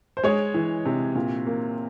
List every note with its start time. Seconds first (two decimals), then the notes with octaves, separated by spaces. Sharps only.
0.17 C5
0.23 G#3 C#5
0.54 E3
0.86 C3
1.15 A#2
1.46 A#3